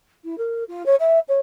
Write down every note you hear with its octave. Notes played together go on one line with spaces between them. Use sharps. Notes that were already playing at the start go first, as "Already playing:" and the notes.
E4
A#4
F4
C#5
E5
C#5